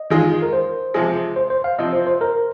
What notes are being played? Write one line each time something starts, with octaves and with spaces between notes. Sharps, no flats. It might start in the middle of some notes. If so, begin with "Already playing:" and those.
Already playing: D#5
D#3 G#3 F4
A#4
C5
C3 F3 G#3
C5
C5
F5
C3 F3 C4 F4 D#5
C5
C5
A#4